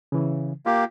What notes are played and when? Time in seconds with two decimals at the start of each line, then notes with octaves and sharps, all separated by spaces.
0.12 C#3 E3
0.66 A#3 F4 G4